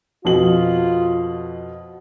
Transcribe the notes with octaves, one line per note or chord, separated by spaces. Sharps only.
F2 B2 F4 F#7